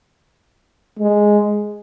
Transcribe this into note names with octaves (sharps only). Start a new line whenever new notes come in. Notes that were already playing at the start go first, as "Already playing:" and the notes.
G#3